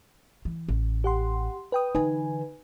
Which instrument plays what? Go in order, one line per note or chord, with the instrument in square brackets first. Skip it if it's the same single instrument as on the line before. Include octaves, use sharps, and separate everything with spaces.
[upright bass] E3
A1
[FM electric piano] G4 F#5 C6
B4 G5 D#6
[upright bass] D3 E3 [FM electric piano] D#4 B4 G#5